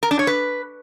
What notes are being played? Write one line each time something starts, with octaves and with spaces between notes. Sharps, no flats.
A#4
D4
C#5
B4